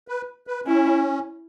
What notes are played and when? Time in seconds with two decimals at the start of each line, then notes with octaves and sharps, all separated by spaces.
0.08 B4
0.47 B4
0.66 C#4 E4